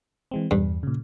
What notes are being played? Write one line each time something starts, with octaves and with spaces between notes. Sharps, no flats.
E3 G#3 C4
E2 G2
A#2 C#3